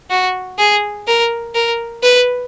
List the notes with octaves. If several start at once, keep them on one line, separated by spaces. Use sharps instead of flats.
F#4
G#4
A#4
A#4
B4